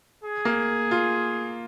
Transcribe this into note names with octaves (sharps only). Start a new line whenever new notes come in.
G#4
A#3
F4